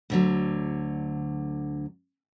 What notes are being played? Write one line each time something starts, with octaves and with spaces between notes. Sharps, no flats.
D2 D3 F#3